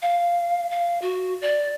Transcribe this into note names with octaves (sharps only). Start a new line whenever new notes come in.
F5
F5
F#4
D5